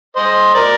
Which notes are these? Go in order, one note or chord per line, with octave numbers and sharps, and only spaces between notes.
C5 D#5
A#4 D5